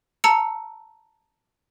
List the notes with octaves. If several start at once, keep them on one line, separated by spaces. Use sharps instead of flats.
A5 A#5 E6 C#7